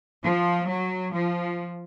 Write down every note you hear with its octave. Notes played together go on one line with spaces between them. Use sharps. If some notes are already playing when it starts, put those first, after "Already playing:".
F3
F#3
F3